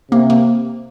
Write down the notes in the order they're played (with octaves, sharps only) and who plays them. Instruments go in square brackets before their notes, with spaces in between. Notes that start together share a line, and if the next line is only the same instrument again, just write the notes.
[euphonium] C3 [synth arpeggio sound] A#3
[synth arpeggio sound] A#3